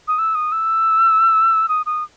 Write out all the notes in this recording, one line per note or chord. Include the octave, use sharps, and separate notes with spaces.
D#6
E6
D#6
E6
D#6
D#6